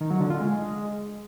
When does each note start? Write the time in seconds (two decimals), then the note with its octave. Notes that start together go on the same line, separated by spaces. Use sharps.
0.01 D#3
0.10 F#3
0.20 D3
0.30 F4
0.40 G#3